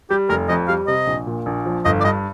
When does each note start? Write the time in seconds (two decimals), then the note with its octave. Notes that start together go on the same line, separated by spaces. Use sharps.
0.10 G3 G4
0.29 F1 A#4
0.49 F2 D#5
0.68 G3 F5
0.87 C3 D#5
1.07 A#1
1.27 A#2
1.46 A#1
1.66 F3
1.85 G1 D#5
2.01 D5
2.04 G2 D#5